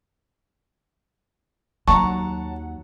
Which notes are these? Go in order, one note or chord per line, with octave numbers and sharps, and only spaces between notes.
D#2 F#3 F#5 A5 A#5 C#6